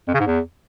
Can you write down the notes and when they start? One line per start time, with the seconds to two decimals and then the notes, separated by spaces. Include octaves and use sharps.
0.08 F2
0.14 C#3
0.20 G#2
0.27 E2